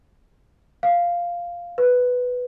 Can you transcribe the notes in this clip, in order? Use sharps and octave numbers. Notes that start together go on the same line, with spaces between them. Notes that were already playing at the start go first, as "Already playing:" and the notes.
F5
B4